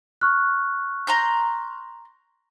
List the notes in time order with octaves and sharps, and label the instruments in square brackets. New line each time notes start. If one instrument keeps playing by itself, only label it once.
[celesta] C#6 F6 F#6
[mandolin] A#5 C6 G6